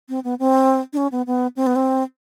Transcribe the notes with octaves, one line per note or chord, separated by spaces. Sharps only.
C4
B3
C4
D4
C#4
B3
B3
C4
B3
C4